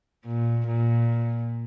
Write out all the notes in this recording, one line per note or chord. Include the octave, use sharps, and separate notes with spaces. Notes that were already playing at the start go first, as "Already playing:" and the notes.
A#2
A#2